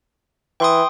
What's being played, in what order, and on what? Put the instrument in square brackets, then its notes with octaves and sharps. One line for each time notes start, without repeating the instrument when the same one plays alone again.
[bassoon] E3 [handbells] G5 C6 D#6